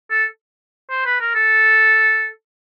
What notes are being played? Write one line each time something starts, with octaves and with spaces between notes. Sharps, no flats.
A4
C5
B4
A#4
A4